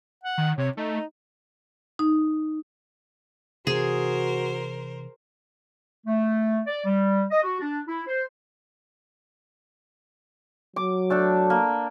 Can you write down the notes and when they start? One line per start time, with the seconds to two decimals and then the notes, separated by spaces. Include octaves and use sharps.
0.24 F#5
0.38 D#3
0.58 C3 C#5
0.77 A3 D#4
1.99 D#4
3.67 C3 E3 F#4 G#4 A#4 C5
6.06 A3
6.67 D5
6.86 G3
7.31 D#5
7.43 F#4
7.61 D4
7.88 E4
8.07 C5
10.76 F#3 D6
11.10 A3 D4 A4
11.50 A#3